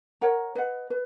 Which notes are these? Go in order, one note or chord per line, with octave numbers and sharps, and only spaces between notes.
A#4 C#5 F#5 A#5
B4 D#5 F#5
B4